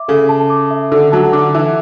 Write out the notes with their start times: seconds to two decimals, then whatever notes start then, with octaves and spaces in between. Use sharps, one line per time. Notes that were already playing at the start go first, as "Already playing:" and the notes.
Already playing: E5 D6
0.08 C#3 A4
0.29 A5
0.50 D6
0.71 E5
0.92 D3 A4
1.12 F#3 A5
1.33 D3 D6
1.54 E3 E5